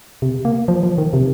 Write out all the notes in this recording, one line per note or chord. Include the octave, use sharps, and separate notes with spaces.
C3
A#3
F3
F3
D#3
C3